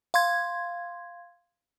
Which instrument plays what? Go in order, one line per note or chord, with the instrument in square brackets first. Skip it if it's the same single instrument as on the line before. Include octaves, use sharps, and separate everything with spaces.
[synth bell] F5 C6 G#6